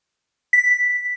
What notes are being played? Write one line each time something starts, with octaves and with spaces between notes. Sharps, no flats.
B6